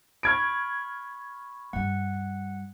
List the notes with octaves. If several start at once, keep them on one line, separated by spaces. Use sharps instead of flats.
B5 C#6 F6 G#6 D7
G2 G3 F#5